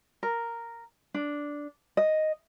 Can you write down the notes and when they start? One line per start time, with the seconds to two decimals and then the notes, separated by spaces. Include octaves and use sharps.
0.23 A#4
1.14 D4
1.97 D#5